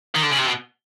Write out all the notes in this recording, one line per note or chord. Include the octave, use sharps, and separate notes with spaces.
D#3
D3
C#3
C3
B2